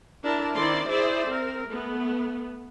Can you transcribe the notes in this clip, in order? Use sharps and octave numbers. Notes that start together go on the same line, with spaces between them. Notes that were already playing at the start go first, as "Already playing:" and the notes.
D4 E4 A#4 A5
D#3 C4 E4 D5 C6
E4 G#4 C5 D5 E5
C4 A#4
A3 B3